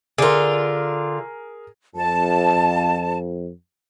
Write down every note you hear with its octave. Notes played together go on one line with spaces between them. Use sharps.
D3 F4 G#4 A#4
F2 A5